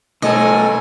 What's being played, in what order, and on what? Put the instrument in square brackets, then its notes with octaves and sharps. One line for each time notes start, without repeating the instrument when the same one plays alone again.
[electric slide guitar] B2 A3 A4 [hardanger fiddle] A#3 G#5 [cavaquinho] D#5